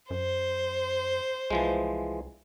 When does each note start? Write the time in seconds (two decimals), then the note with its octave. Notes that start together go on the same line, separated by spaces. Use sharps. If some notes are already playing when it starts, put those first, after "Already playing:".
0.10 F#2 C5
1.50 C2 E3 F3 G#3